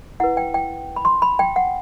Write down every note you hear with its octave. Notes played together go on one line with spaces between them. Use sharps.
E4 B4 F#5
G5
G5
B5
C6
B5
G5
F#5